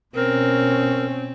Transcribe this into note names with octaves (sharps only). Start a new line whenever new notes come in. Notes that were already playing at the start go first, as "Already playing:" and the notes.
B2 C4 C#4 A#4